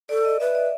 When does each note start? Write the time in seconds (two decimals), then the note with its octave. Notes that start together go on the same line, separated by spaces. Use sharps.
0.09 A4 D5
0.25 D#5
0.40 B4 E5
0.55 D5